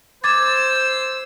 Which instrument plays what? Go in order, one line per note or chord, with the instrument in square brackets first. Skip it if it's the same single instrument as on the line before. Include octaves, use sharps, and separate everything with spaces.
[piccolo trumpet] C5 [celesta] D6 G#6 A6 [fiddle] E6